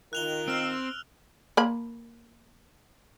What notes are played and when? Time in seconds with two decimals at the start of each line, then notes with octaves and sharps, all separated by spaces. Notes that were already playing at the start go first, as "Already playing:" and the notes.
0.13 D#3 F4 A#4 F#6 F7 G7
0.48 C4 E6 F6
1.57 A#3 B5